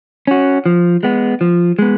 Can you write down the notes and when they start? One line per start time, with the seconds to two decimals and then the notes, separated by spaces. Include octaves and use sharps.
0.27 C#4 F#4
0.66 F3
1.03 G#3 B3
1.41 F3
1.79 G#3 B3